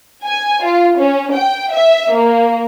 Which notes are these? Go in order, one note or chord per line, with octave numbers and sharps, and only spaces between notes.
G#5
F4
C#4
G5
E5
A#3